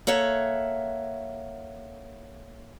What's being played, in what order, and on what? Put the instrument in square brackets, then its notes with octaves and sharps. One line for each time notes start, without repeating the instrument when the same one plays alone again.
[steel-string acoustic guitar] A#3 A4 C#5 E5 F#5